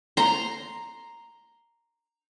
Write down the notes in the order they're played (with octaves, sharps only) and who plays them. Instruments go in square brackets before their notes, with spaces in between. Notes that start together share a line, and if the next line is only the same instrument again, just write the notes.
[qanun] A#5 C6